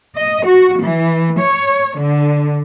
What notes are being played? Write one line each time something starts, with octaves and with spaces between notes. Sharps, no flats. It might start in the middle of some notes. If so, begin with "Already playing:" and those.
D#5
F#4
E3
C#5
D3